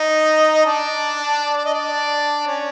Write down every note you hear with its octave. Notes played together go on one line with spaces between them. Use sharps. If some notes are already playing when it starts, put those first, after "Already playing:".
Already playing: D#4 D#5
D4 D5
D5
D#5
D4 D5
C#4 C#5